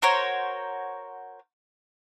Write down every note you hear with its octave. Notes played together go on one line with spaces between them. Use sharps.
F#4 A#4 C5 C#5